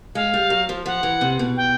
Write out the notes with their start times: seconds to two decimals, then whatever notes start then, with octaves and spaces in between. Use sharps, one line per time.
0.15 G#3 F5
0.34 G3
0.50 F#3
0.69 F3
0.86 F3 F#5
1.03 E3
1.21 C3
1.39 B2
1.57 G5